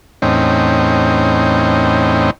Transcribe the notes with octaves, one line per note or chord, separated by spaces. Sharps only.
E2 A2 C4 C#4 D#4 G5